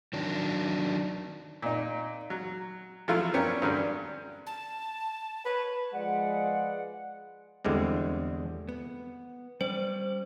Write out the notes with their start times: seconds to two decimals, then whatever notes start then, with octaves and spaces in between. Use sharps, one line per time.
0.13 D#3 F#3 D4
1.62 A#2 D#4
2.30 F#3
3.08 F3 F#3 A3 E4 F4
3.34 B3 C#4 D4 A#4 G5
3.62 G2 D3 F#3 G3
4.47 A5
5.45 B4 C#5
5.93 F3 G#3 B4 D5 F#5
7.65 E2 D3 G3 G#3 C4
8.69 B3
9.61 G3 C#4 C5 D5